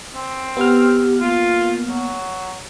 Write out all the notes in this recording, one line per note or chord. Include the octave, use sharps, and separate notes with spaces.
C4
B3 G4 F6
A#3 F4
F#3